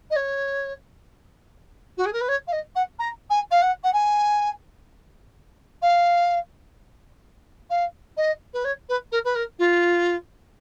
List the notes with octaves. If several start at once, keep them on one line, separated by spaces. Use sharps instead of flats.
D#5
C#5
F#4
G#4
A#4
B4
C#5
F5
D#5
F#5
A#5
G#5
F5
F#5
F#5
G#5
F5
F5
D#5
B4
C#5
B4
A#4
B4
A#4
F4